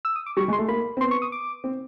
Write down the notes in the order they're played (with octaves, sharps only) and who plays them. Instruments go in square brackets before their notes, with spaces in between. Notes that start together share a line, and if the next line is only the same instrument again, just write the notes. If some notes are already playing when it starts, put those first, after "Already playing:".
[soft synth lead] E6
D#6
D6
[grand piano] G3 [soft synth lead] C#6
[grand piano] G#3
[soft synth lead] C6
[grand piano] A3
[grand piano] A#3 [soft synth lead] B5
[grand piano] C4
[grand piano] B3 [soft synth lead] C6
[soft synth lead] C#6
D#6
D6
[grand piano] C4